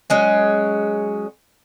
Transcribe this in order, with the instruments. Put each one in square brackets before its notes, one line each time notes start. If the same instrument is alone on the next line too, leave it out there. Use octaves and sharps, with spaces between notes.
[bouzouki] F#3 G#3 C#4